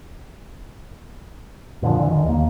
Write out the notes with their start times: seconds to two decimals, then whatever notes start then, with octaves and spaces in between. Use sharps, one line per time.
1.82 F2 A#2 D3 F3
1.99 D3 E3
2.11 D#3
2.24 D#2 A#3